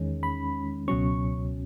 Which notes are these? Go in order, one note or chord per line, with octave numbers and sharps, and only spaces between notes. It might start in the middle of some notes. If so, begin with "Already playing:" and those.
Already playing: E2 D#3 G#3 C#4
B5
C#2 B2 F#3 C#4 C#6